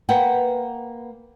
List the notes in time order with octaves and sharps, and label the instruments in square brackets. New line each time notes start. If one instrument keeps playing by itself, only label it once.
[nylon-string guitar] A#3 B4 F#5 G5